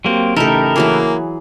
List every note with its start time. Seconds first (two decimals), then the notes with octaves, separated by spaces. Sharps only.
0.05 F#3 A#3 C4 G4
0.36 A1 C#3 A3 D#4 E4 G4 A4 A#4
0.76 E3 F#3 A#3 G#4